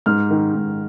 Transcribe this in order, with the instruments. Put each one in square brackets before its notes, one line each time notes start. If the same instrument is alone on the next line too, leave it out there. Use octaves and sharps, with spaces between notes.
[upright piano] G#2 F6
D#3
G#2